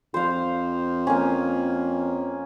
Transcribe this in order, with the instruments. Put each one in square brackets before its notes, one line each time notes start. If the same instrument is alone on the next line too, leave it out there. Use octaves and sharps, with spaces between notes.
[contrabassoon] F2 [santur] C5 F5
[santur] A#3 C#4